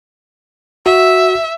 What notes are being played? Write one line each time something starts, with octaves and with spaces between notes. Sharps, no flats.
F#4 E5